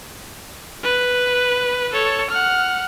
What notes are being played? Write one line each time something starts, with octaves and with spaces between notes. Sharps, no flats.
B4
A4 C#5
F#5 F6